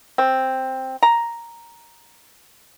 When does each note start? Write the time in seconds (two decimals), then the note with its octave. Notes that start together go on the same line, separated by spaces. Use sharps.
0.18 C4
1.03 A#5